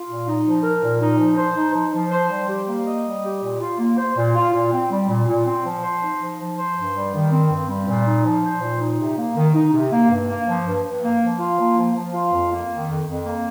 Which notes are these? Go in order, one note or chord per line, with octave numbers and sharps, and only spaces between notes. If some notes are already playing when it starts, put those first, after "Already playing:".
Already playing: F4
A#2
D#4
F3
A#4
A#2
D#4
F3
C5
D#4
F3
F3
C5
G3
G4
A#3
D#5
G3
G4
A#2
F4
A#3
C5
A#2
F4
A#2
C4
G3
A#2
A#2
C4
F3
C5
D#4
F3
F3
C5
G2
G3
D#3
C4
G2
G3
A#2
D#4
F3
C5
A#2
D#4
C3
A#3
D#3
D#4
C3
A#3
G2
A#3
F3
G2
G2
A#3
F3
F4
A#3
F3
F3
F4
F2
A#3
D#3
F2
F2
A#3